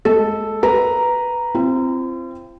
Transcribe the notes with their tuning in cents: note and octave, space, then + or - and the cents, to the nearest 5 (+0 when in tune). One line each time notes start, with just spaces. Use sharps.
G#3 +25 A4 +0
B4 +0 A#5 +0
C4 +0 F4 -45